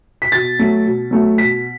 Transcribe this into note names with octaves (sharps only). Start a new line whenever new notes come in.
B6
B2 A6
F#3 A3
B2
F#3 A3
B2 B6